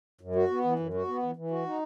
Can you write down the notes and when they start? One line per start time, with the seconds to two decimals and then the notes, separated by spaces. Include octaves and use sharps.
0.21 F#2
0.36 F#4
0.51 B3
0.64 E3
0.79 F#2
0.94 F#4
1.08 B3
1.23 E3
1.36 E3
1.51 F#4
1.66 D#4